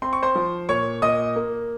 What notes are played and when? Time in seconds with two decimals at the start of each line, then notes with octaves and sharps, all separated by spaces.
0.02 C4 C6
0.13 C#6
0.23 C5 C6
0.35 F3
0.69 A#2 C#5 C#6
1.02 A#2 D#5 D#6
1.36 A#3